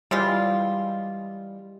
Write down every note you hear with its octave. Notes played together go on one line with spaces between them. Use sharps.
E3 G3 G#3 F4